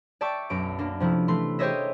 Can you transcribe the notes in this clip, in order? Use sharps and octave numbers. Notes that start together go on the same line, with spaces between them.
D5 E5 G5 A5 C#6 D6
B1 F#2 D7
A#3 D4
C3 F3 A3 E4
E3 A3 C6
G4 G#4 C5 C#5 D#5 E5